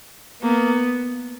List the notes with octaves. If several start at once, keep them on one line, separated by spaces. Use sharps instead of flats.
A#3 B3